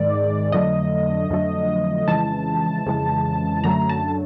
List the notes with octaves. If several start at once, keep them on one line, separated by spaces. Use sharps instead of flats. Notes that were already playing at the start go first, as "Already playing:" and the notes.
Already playing: G#2 D#3 G#3 D5
F2 D3 F#3 A3 D#5
F2 D3 F#3 A3
F2 C#3 E3 G#3 A5
F2 C#3 E3 G#3
F#2 D3 F#3 A3 A#5
A5